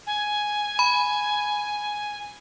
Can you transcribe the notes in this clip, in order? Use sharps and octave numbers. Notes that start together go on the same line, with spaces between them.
G#5
B5